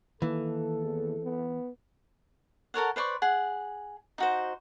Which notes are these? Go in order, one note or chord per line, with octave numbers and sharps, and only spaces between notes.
D#3 E3 A#3 A4
E2
B3
A4 A#4 C#5 F#5
B4 C5 D5 C#6
G#4 F#5
D#4 F#4 C5